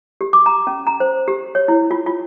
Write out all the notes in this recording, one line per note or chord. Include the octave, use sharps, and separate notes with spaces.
G4
D6
A#5
C#4
A#5
C5
G4
C#5
E4
F4
F4